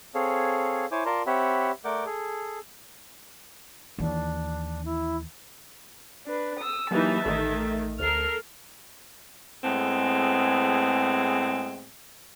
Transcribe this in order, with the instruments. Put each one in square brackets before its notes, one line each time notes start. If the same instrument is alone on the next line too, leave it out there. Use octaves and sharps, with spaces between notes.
[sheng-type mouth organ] C4 G#4 A4 C#5 F5
E4 C5 C#5 G#5 D6
F4 A#4 D5 A5 A#5 C6
C4 G4 C#5 E5 F#5 B5
A3 A#4 D5 F#5 D6 G6
G#4 A4
[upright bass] D#2 E3 [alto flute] D4
[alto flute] E4
[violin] D4 B4
D#6 E6
[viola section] E3 D#4 B4 [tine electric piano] F#3 A#3 G4 [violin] E5 A5
[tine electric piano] A1 [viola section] D#3 A3
[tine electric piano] D2 [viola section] A4 A#4 [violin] F6 C7
[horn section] A2 G#3 B3 C4 G#4